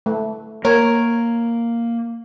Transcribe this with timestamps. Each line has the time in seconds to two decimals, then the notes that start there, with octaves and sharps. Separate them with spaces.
0.06 A3
0.65 A#3 A#4 C#5